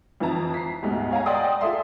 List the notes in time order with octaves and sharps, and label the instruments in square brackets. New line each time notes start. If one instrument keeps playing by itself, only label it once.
[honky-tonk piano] F2 E3 D#4 A5 A#5
B6 C7
D2 G#2 B2
C#5 F5 G#5 A#5
D5 D#5 F#5 G5 C6 D#6
F4 G#4 A4 E5 C6